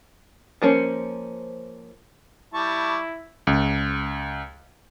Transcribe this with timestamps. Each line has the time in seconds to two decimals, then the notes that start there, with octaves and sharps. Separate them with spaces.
0.62 F3 A#3 C#4 C5
2.54 G3 E4 A5 C#6
3.47 C#2